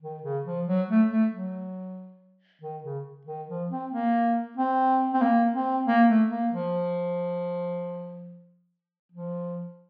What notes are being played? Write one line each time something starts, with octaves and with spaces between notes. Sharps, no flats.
D#3
C#3
F3
F#3
A3
A3
F#3
D#3
C#3
D#3
F3
C4
A#3
C4
C4
A#3
C4
A#3
A3
A#3
F3
F3